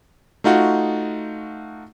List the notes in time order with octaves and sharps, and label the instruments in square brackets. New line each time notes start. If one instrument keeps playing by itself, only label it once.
[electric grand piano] A3 D#4 F4 F#4